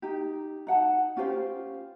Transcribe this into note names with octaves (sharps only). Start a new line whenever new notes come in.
D#4 G4
D#4 F#5 A5
C#4 F4 G4 C5